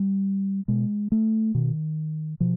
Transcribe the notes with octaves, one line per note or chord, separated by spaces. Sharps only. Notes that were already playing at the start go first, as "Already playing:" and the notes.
Already playing: G3
B2 G#3
A3
B2 D#3
B2 F3